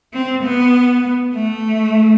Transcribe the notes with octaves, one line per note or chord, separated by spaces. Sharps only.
C4
B3
A3